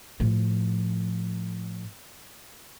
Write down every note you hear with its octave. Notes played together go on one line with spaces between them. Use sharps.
A2 F3